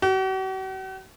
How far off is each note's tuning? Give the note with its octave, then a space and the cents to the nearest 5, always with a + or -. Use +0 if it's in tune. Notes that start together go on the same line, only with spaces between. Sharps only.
F#4 +45